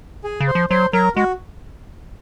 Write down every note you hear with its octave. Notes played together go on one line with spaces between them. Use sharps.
G#4
C#3
C5
F3
F#3 C5
F#3 A#4
G#3 F#4